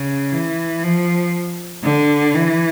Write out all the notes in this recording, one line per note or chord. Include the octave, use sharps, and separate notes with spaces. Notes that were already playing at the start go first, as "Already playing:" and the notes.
Already playing: C#3
E3
F3
D3
E3